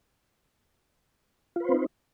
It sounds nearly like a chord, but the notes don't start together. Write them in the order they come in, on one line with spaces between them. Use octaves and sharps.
F4 B4 C5 C4 D#4